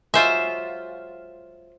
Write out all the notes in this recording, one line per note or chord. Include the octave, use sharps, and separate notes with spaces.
F#3 G#3 F4 C5 E5